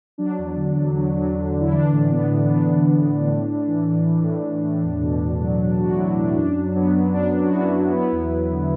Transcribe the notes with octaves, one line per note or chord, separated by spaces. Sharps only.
F#3 D4
E2
D3
F#3
F#3
F#3
D3
D3
E4
E3 D4
A2
A2 B3
A2
B3
E3 D4
A2
A2
A2
A2
A2
E3
A2
E3
A2
A2
A2
E2
B2
E2
F#3
E2 D4
F#3 D4 F#4
E4
F#3 D4
E2 D4
E4
F#2 D4
F#3
F#3 B3
F#3
F#2 D4
F#3
F#4
F#2 B3 E4
F#3
F#3 B3 E4
E2
F#3
D3